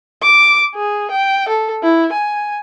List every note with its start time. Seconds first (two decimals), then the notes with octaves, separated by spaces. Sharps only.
0.22 D6
0.75 G#4
1.11 G5
1.48 A4
1.83 E4
2.13 G#5